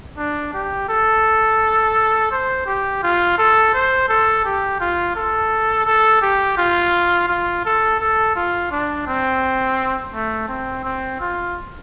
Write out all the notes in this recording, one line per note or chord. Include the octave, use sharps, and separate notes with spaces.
D4
G4
A4
C5
G4
F4
A4
C5
A4
G4
F4
A4
A4
G4
F4
F4
A4
A4
F4
D4
C4
A3
C4
C4
F4